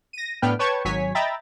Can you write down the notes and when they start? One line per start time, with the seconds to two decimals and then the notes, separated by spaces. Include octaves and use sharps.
0.13 A#6 D#7
0.42 A2 B3 D4 B4 G5 F6
0.59 B4 C#5 G5 A5 C#6 G#6
0.85 G#1 F#3 C#5 G#5 B6
1.15 D#5 E5 G5 A#5 B5 A6